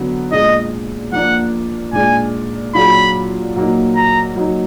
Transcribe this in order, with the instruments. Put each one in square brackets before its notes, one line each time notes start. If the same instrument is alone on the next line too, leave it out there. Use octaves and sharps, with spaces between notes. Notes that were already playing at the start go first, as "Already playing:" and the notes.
Already playing: [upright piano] D3 F#3 B3
[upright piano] A#2 G#3 D4 G#4 [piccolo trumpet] D#5
[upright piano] F3 A#3 D4 [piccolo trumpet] F#5
[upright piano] A#2 G#3 D4 [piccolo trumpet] G#5
[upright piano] A#2 F#3 D4 F4 G#4 [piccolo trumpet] B5
[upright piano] A#2 F#3 A#3 D#4
[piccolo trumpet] A#5
[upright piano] F#3 A#3 D#4